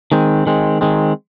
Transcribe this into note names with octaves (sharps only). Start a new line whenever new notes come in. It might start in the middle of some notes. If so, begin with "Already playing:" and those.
D#3 G#3 C4
D#3 G#3 C4
D#3 G#3 C4